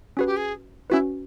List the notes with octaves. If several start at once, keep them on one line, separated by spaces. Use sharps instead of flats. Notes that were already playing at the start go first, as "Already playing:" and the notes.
C#4 F#4 G#4 B4
G4
G#4
C#4 E4 F#4 B4